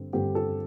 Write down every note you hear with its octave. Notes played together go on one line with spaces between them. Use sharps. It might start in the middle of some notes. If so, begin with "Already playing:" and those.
Already playing: G2 D3 C4
G2 D3 C4 G4
A4